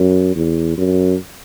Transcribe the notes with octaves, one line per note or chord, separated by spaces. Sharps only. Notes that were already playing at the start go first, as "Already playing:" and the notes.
Already playing: F#2
E2
F#2